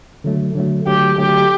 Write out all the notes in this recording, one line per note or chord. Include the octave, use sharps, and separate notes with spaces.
D3 F#3 A3
D3 F#3 A3
D3 F#3 A3 G4
D3 F#3 A3 G4